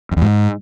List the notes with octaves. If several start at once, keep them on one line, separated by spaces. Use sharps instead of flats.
F2
E2
G#2